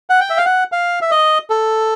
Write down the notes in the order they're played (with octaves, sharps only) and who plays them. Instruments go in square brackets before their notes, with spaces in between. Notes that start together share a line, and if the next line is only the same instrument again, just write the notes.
[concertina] F#5
G5
E5
F5
F#5
F5
E5
D#5
A4